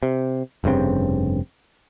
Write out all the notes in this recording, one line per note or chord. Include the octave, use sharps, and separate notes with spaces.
C3
F1 G2 C#3 C4